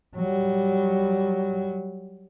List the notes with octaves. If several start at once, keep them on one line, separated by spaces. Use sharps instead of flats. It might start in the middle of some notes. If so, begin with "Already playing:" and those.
F#3 G3